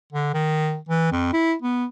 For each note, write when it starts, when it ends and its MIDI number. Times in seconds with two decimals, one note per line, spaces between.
0.13 0.32 50
0.34 0.77 51
0.89 1.11 52
1.12 1.32 41
1.33 1.55 64
1.62 1.85 59